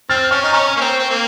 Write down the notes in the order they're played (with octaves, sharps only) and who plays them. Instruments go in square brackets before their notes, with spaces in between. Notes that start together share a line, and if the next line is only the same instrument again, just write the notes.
[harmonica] C4 [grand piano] F6 A6
[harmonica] C#4 [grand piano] C#6 F6
[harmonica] D#4
[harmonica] C#4 [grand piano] A#5 C#6
[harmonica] A#3
C4
C4
A#3